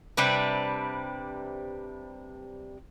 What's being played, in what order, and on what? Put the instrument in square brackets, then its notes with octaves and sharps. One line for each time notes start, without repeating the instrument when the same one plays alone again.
[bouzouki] C3 G3 D4 B4